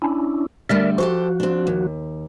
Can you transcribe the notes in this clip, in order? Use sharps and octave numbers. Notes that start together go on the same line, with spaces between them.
C#4 D4 E4
D3 G3 A3 A#4 D5 E5
F3 F#4 G4 A4 C5
C4 D4
D#2